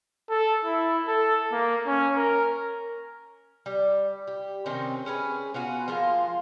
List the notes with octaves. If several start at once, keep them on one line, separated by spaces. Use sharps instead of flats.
A4
E4
A4
A#3
C#4
A#4
G3
G4
C3 D#3 C4 C#4
G#3 C#4 G#4 B4
B3 F4 F#4 G#5
F3 G#3 A#3 F4